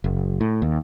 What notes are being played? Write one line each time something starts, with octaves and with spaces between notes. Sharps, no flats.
F#1
A2
D#2